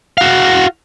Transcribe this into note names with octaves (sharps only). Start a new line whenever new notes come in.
F#4 F5